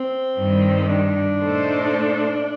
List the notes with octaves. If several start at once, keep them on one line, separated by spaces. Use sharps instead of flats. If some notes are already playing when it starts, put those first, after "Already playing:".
Already playing: C4
G2 D#3 G3
D4
A#2 A3 D#4 A4 C5